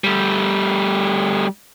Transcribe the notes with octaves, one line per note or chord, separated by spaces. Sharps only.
G3 A3